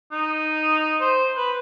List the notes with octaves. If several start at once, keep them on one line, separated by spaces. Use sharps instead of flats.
D#4
C5
B4